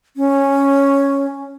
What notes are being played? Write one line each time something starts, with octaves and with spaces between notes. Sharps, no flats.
C#4